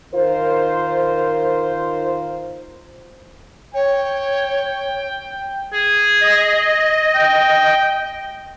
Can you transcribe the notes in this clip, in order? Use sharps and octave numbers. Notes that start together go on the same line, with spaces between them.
D#3 F4 A#4 C5
C#5 G5
G#4
D#5
G5